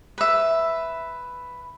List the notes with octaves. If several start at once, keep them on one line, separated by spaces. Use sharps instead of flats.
B4 E5